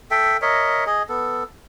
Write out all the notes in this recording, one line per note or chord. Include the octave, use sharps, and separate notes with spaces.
A4 E5 G5
A#4 C#5 D#5 E5
G#4 D#5
B3 A4